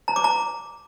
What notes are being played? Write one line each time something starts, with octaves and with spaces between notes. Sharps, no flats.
A#5
D6
A#5